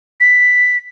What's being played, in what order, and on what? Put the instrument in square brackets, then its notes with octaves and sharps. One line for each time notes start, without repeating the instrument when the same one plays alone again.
[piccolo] B6